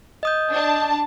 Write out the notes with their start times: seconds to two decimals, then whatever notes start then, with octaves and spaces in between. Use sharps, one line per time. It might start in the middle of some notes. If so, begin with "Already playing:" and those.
0.23 D#5 D#6 G6
0.52 D4 A5